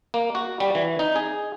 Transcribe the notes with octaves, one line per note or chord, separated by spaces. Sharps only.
A#3
F#4
G3
E3
D#4
G#4